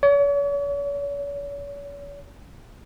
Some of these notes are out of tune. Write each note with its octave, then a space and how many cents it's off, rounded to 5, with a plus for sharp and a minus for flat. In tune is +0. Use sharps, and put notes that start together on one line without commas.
C#5 +40